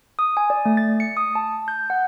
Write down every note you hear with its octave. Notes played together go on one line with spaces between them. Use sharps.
D#6
G#5
D5
A3
A6
C#7
D#6
A5
G6
F#5